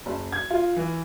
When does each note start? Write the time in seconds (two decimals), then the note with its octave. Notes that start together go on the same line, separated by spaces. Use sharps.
0.06 F#1
0.32 G#6
0.50 F4
0.76 E3